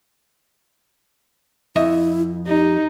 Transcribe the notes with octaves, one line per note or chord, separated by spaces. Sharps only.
F2 E4 D#5 E5
D#4 G4